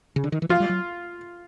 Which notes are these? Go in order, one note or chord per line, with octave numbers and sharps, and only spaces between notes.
C#3
D3
D#3
E3
F3 F4
G3
F#3